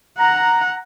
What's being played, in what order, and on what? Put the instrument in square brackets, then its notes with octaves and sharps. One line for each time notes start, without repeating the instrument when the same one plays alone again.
[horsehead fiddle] F#5 [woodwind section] A#5